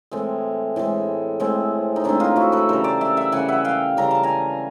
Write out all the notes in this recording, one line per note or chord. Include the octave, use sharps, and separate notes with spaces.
A2 E3 G#3 C4
A2 E3 G#3 C4
A2 E3 G#3 C4
D#4
A2 E3 G#3 C4 D4 E4
D#4 F4
E4 F#4
A4 B4
C#3 E3 G3 A#4 C5
C5 D5
D5 E5
E5 F#5
C#3 E3 G3 F#5 G#5
E5 F#5
F5 G5
C#3 E3 G3 A#5
A5
G#5 A#5